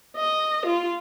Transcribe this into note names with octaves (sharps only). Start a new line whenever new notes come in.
D#5
F4